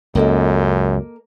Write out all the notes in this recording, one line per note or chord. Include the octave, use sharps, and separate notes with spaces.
C#2 F#2 A#3 A4 D#5